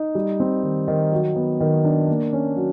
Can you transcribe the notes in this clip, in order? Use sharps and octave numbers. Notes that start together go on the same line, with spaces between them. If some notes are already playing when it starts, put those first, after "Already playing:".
Already playing: D#4
G3
C4
D#3
D#3
F#3
B3
D#3
D4
A#3
C#4
F#3